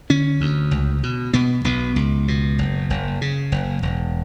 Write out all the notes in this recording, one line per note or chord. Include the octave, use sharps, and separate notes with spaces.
D3 C#4
D2
C#2
B2
B2 B3
B1 B3
C#2
B2
F#1
F#1
C#3
F#1
E1